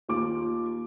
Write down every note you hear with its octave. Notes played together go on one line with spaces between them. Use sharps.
D#2 F4 D6